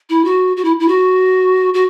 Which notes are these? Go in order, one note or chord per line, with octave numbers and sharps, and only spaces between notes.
E4
F#4
F#4
E4
E4
F#4
F#4